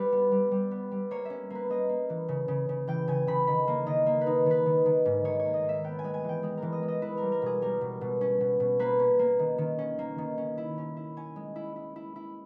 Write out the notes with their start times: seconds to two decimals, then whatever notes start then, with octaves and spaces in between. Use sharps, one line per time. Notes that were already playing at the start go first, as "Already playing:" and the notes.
Already playing: G3 B4
0.12 B3
0.31 G3
0.51 G3
0.71 B3
0.91 G3
1.11 A#3 C#5
1.25 C#4 E5
1.50 A#3 B4
1.70 A#3 D#5
1.89 A#3
2.10 E3
2.28 C#3
2.48 C#3
2.69 C#3
2.87 E3 G5
3.08 C#3 G#5
3.27 C#3 B5
3.47 D#3 B5
3.68 A#3
3.86 D#3 D#5
4.06 A#3
4.21 B4
4.27 D#4
4.46 D#3 B4
4.66 D#3
4.86 D#3
5.05 G#2
5.25 D#3 C#5
5.39 C#5
5.45 A#3
5.54 D#5
5.64 A#3 E5
5.84 B3 G5
5.99 G#5
6.04 G#3
6.14 G#5
6.24 E3 G5
6.43 G#3 G#4
6.57 E3 A#4
6.72 D#5
6.83 G#3
6.88 D#5
7.02 E4 B4
7.17 G3 A#4
7.32 A#4
7.42 B2 G#4
7.62 G3 A#4
7.81 B2
8.01 B2
8.21 C#4
8.41 B2
8.60 B2
8.79 A#3 B4
8.99 C#4
9.19 A#3
9.39 D#3
9.58 D#3
9.79 C#4
9.99 A#3
10.18 D#3
10.38 C#4
10.58 E4
10.78 C#4
10.97 E4
11.17 C#4 G#5
11.36 G#3
11.56 E4
11.76 E4
11.96 E4
12.16 E4